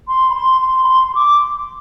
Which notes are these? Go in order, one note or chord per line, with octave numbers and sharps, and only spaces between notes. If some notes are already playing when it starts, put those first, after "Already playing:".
C6
B5
C6
C6
B5
C6
C6
D6